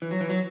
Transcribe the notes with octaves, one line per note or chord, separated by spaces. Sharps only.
E3
F#3
E3
F#3